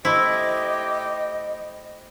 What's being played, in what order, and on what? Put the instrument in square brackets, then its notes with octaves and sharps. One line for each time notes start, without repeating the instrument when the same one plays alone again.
[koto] A3 E4 [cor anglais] G4 [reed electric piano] C5 [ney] D#5